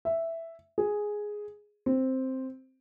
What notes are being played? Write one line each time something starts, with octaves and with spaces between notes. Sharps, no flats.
E5
G#4
C4